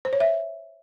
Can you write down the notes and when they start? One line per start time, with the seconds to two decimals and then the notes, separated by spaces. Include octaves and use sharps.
0.05 C5
0.13 C#5
0.20 E5